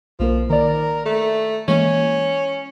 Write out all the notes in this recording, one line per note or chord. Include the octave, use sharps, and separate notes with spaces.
B1 F3 A#3 A#4
D#3 A#4 D5
A3
E3 G#3 A#3 C#4